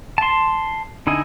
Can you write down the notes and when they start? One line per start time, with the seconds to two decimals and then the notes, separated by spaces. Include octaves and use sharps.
0.18 A5 C6
1.07 D3 D#4 E4 D#5 G#5